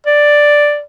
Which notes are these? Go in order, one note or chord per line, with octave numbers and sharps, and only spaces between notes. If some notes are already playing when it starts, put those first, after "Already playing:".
D5